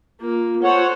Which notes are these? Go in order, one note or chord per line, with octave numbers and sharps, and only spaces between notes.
A#3 F4
A4 C5 C#5 F#5